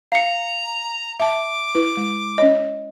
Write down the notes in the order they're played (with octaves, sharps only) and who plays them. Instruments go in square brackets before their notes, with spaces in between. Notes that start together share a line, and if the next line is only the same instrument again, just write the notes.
[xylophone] F5 C#7 [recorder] A#5
[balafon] E5 A5 [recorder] D6
[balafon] E4 B4
G#3
[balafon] C#4 C#5 [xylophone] D#5